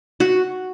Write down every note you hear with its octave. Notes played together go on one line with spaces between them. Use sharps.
F#4